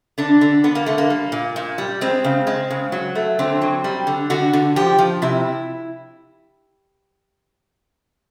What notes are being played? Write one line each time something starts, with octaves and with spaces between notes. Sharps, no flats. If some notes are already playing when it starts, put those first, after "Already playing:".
D3 D4
D3
D3 B3
A#3
D3 A3
A#3
G3
A#2
A#2
G3
G#3 C4
C#3
G#3
C#3
F#3
A3
D3 C4
F#3
G3
D3
D3 F#4
D3
F3 G4
F3
C3 E4